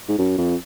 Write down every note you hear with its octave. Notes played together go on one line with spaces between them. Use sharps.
G#2
F#2
F2